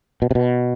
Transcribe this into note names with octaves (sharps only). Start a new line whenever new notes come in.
B2
C3
B2